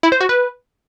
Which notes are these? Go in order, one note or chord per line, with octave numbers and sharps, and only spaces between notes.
E4
C5
F#4
B4